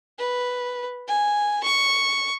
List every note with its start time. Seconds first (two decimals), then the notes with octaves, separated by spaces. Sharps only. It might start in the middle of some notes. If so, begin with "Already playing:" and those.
0.19 B4
1.08 G#5
1.64 C#6